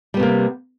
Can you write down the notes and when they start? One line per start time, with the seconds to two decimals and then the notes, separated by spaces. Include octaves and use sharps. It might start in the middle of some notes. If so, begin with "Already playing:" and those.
0.14 G3
0.17 B3
0.20 C3
0.23 A#3